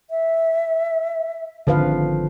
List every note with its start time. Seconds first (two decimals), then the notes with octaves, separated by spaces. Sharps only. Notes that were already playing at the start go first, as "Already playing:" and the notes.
0.10 E5
1.67 G#1 D3 F3 B4 F5